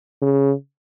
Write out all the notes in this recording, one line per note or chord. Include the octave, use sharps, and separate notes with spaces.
C#3